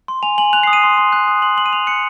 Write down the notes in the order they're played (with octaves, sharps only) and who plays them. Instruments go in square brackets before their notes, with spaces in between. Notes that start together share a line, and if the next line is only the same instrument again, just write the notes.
[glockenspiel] C6
G#5 F7
G#5 F#7
F#6 F7
C7
D#6
D#7
C6
C6
F#6
D#6
C6 F#7
C6 F#7
D#7
C6 F7
F#6 C#7